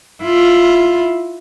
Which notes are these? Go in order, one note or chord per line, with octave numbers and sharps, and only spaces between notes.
E4 F4